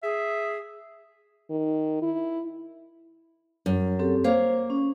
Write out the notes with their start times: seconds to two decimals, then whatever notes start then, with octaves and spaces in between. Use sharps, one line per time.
0.03 G#4 E5
1.50 D#3
2.02 E4
3.66 F#2
3.99 C4 G4 A4
4.24 A#3 C5 C#5 F5
4.70 C#4